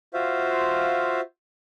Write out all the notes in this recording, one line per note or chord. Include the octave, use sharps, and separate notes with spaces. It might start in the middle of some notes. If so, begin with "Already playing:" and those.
F4 F#4 C5 E5 F5